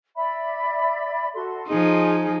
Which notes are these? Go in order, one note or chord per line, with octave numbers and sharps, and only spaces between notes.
D5 E5 B5
F#4 A4 C6
F3 D#4 G#4